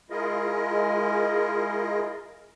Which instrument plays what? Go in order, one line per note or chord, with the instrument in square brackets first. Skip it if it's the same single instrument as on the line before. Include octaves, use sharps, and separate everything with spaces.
[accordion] G#3 E4 F4 G#4 A#4 D#5